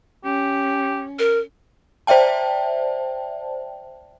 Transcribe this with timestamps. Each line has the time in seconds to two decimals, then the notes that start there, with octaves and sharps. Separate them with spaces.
0.25 C#4 G4
1.19 A#4
2.07 C5 D5 E5 G5 A5